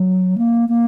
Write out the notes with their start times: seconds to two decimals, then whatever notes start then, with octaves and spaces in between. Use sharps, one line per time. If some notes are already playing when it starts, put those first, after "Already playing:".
Already playing: F#3
0.38 A#3
0.69 A#3